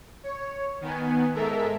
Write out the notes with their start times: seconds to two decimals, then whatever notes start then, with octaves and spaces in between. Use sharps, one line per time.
0.23 C#5
0.81 D#3 B3 G#5
1.34 G#2 G#3 A4 A#4 E5 B6